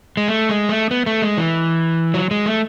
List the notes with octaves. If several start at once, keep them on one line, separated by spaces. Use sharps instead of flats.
G#3
A3
G#3
A3
B3
A3
G#3
E3
F#3
G#3
A3